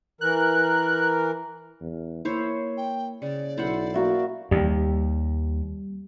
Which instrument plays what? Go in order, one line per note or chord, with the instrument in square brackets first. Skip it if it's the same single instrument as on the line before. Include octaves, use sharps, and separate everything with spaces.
[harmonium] E3 A#4 [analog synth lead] F#6
[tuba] E2
[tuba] A#3 [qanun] E4 C5 C#5
[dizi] G5
[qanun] C#3 [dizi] D5
[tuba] B1 [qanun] E4 C5 F#5
[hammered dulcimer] A#3 F#4 E5
[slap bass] D#2 [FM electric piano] G3